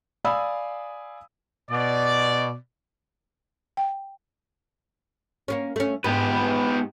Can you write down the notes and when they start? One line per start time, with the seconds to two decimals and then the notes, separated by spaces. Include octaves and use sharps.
0.24 D5 F5 G#5 B5 D#6 E6
1.71 B2 D5
3.77 G5
5.48 A#3 B3 C#4
5.76 A3 C#4
6.04 G#2 B3 G4 B4